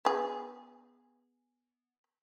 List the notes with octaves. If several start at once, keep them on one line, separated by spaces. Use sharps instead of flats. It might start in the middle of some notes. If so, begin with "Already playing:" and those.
B3 G#4